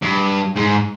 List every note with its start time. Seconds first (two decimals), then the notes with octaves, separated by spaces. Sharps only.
0.02 G2
0.57 G#2